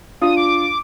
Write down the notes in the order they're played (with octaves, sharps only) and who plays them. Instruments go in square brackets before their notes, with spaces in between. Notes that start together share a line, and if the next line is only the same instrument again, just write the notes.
[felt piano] D4 F4 [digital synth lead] D#6
[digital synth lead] D6